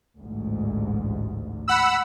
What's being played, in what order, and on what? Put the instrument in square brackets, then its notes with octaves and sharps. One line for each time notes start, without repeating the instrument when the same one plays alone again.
[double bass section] A1 D2 G#2
[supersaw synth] F#5 B5 E6